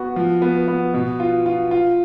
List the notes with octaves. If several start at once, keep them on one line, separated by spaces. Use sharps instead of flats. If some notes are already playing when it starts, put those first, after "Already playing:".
Already playing: B3 F#4
F3
B3
B3
B2
F4
F4
F4